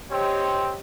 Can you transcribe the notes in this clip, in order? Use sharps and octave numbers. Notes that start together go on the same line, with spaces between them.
C4 G4 C#5 D#5